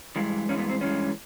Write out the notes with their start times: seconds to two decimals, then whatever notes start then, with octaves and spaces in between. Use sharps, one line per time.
0.16 G2 E3 G#3
0.49 G2 E3 G#3 C#4
0.59 B3
0.69 C4
0.80 G2 E3 G#3 C#4